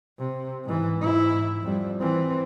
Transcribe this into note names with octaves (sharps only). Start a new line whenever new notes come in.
C3
G#2 E3
G#2 E4
F2 G3
E3 C4